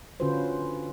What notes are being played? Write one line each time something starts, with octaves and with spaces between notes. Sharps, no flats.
D3 C#4 F4 F#4 B4 C5